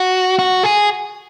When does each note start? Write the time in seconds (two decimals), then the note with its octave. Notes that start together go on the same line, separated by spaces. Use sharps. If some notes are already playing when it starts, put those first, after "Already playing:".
Already playing: F#4
0.39 F#4
0.63 G#4